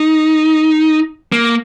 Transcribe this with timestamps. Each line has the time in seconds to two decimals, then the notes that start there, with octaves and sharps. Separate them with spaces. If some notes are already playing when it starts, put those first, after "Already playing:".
Already playing: D#4
1.32 A#3